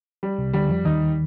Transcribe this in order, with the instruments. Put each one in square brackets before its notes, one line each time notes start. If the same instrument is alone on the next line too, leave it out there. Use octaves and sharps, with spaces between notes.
[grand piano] G3
[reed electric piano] C2 C3
[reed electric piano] D2 D3 [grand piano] G3
[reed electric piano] F2 F3
[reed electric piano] D#2 D#3 [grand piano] D#4